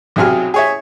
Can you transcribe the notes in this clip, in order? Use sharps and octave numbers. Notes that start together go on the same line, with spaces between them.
B1 C3 F#3 G#4 F6
G#4 C#5 E5